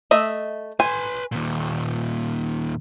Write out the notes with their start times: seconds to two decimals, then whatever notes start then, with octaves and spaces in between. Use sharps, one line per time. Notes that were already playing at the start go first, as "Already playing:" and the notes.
0.11 A3 D#5 E5
0.80 B4 G#5 C6
1.32 D#2 A#2